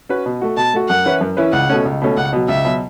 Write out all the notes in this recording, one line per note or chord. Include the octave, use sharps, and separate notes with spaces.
C#4 F#4 B4
B2
A3 F#4
B2 A5
A3 F#4
F#2 F#5
E3 C#4 E4 B4
F#2
E3 C#4 E4 B4
C#2 F#5
B2 A3 C#4
C#2
B2 A3 C#4
C#2 F#5
B2 F#3
C#2 E5
B2 F#3